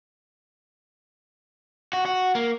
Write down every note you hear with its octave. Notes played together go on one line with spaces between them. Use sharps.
F#4
F#4
A#3